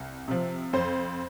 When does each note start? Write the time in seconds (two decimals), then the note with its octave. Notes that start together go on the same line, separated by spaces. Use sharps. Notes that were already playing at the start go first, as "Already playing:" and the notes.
Already playing: C2
0.28 C3 F3
0.73 F2 C5